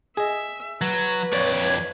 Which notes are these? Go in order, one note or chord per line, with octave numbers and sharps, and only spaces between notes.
G#4 D#5 E5
F#3 B4
F2 C#5 D5